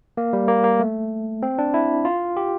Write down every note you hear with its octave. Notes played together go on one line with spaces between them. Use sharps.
A#3
G3
A#3
A#3
A3
C4
D4
E4
F4
G4